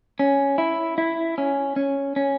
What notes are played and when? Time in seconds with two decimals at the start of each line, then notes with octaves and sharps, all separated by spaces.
0.19 C#4
0.58 E4
0.98 E4
1.38 C#4
1.76 C#4
2.16 C#4